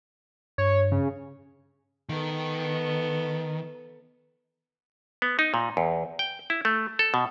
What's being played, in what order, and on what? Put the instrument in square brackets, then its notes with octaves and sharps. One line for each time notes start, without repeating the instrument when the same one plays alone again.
[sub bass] G2 [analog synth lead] C#5
[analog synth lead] C#3
[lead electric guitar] D#3 [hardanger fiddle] B3 A4
[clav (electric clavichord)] B3
D#4
A#2
E2
G5
E4
A3
A4
B2